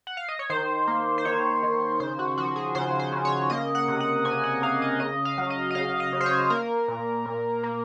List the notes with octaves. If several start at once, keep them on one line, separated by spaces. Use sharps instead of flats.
F#5
F5
D#5
C#5
D#3 C5
A#3
C5
D#3 C#5
D#3
C#3 C5
F#4
F3 F#4
G#4
C#3 C5
C5
C#3
C#5
A#3 D#5
F#5
C3
F#5
C3 G#5
F#5
A#3 F5
D#5
C#3 D#5
F5
F#3
D#5
D#5
C#3 F5
D#5
C#3
C5
C#5
A#3 A#4
A#2
A#2
A#3